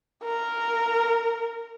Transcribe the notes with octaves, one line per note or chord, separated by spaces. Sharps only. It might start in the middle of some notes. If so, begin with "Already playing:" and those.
A#4